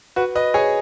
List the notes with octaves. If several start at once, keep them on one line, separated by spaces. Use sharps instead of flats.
F#4 B4
B4 D#5
G#4 C#5